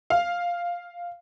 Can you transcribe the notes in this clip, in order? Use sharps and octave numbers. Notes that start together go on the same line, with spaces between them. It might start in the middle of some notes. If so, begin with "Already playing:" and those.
F5